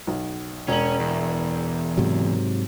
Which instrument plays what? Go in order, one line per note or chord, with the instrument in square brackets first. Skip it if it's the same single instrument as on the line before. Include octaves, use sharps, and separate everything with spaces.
[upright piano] B1
[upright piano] E1 F#7 [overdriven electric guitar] C#4
[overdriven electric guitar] E2
[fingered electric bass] G#2 C3 F#3